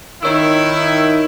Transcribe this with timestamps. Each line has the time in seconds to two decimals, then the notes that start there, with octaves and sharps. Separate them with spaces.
0.23 D#3 D#4 E4 C#5 E6